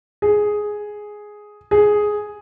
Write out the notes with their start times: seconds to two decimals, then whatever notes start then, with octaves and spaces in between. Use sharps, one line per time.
0.22 G#4
1.71 G#4